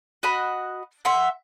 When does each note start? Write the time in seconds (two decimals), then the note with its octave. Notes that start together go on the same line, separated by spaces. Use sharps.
0.23 F#4 D#5 B5
1.05 E5 F#5 C6